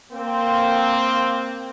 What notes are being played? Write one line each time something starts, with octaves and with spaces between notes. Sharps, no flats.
A#3 C4